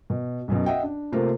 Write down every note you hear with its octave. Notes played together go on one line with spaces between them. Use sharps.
B2
B1 F#2 B2
D#5 E5 F#5 G5
D4
C3 A3 A#3 F4 A#4 C5